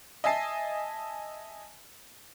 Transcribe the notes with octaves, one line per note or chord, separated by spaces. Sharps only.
D#5 E5 G#5 A5 C7